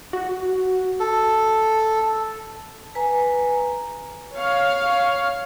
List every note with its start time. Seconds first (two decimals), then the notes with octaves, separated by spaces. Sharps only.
0.13 F#4
1.00 A4
2.95 B4 G#5 A#5
4.34 C#5 F5